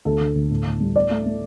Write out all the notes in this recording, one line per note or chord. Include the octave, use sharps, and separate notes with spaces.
D2 A4
D3
D2
A2
A2
G3
A2 D5
A3
A3